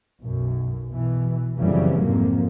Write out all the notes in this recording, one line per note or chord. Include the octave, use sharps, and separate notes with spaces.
B1 F#2
B2 E3
F#1 F2 C#3 E3 F#3 G3
F1 F2 G#2 C3 A#3